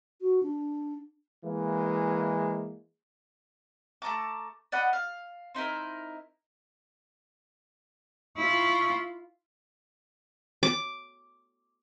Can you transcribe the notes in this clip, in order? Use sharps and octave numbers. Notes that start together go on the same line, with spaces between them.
F#4
D4
E3 G#3 A#3
A3 A5 A#5 D6
D5 D#5 F#5 B5
F5
C4 D#4 E4 A#4
E4 F4 C#6
D6